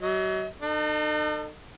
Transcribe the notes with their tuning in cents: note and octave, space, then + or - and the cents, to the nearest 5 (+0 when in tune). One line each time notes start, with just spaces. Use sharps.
F#3 +35 D#5 +45
D#4 -40 A4 +30